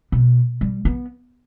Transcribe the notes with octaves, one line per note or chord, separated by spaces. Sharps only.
B2
G3
B3